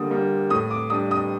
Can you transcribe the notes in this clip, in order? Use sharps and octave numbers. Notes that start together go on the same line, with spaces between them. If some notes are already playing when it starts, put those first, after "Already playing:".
Already playing: D3 G3 A#3 D#6
G3 A#3
A2 D#6
D6
G3 D4 D#6
D#6